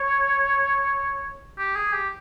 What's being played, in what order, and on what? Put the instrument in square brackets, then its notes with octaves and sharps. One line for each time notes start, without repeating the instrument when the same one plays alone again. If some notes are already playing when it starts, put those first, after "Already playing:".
Already playing: [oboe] C#5
G4
G#4
G4